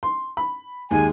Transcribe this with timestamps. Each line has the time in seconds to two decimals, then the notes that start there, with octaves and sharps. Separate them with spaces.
0.03 C6
0.37 B5
0.91 D#2 G#3 G#5